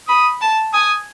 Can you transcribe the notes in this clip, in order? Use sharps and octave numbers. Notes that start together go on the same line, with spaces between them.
B5 D#6
A5
G#5 D#6